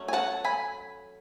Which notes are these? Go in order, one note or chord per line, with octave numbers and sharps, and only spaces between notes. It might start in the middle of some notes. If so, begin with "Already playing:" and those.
Already playing: F#3 A3 C#4
G#5
F#5 A5
G#5 B5